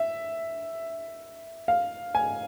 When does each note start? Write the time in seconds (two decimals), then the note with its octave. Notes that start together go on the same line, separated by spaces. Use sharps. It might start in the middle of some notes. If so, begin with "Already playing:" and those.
Already playing: E5
1.68 F5
2.15 G#5